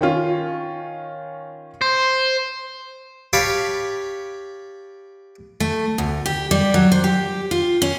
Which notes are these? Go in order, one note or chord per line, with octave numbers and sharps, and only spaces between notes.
D#3 C#4 F4
C5
G4 C#5 F5 G5 A5 B5
A3
D2
G4
G3
F#3
C5
G4
F4
C#4